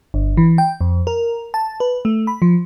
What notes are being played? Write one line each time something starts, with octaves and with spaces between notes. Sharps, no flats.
G1
E3
G5
F2
A#4
A5
B4
A3
B5
F3